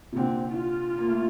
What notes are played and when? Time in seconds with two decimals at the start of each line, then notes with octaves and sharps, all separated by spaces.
0.12 C3
0.16 A#2 D3 C4
0.53 F4
0.98 A#3
1.07 A3